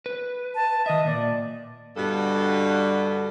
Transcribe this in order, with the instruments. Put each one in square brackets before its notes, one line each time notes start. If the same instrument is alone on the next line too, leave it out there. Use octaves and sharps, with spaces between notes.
[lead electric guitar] B4
[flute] A5
[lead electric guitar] D#3 E5 [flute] D#5
[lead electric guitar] A#2 [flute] D5
[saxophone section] G2 B2 D3 G3 A4